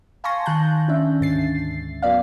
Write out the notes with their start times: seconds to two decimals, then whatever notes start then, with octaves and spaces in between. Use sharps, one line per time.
0.24 F5 G#5 A5 C6 C#6 A#6
0.46 D#3 A5 F#6 G6
0.88 C#4 D4 E5
1.20 D2 G#2 A6 C7
2.02 F#3 B3 D5 F5